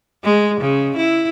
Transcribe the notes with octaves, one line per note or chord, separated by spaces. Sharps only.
G#3
C#3
E4